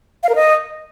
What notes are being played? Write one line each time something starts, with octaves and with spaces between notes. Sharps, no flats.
F5
A#4
D#5